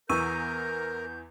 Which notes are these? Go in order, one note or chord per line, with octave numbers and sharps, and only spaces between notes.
E2 E3 A#4 C#6 E6 G6 D#7